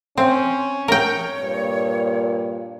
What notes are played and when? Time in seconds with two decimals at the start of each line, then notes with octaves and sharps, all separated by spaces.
0.18 C4 C#4
0.88 A#4 C#5 G5
1.40 G2 A#2